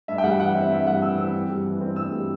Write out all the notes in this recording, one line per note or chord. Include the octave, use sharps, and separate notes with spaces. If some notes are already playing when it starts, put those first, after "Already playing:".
G2 E5
G5
G3 F#5
E3 F#5
C4 E5
G2 E5
G3 F#5
E3 E6
C4 E6
G2
G3
E3
C4
G2 E6
G3